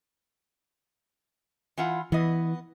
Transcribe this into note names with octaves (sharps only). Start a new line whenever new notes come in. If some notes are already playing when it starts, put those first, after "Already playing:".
E3 F4 F#5
E3 B3 D#5